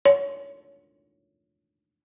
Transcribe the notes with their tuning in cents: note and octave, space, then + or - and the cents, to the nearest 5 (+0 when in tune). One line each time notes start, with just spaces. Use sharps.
C#5 +15